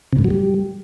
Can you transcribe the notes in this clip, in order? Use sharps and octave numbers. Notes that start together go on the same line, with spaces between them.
C3
G#2
F#3
G3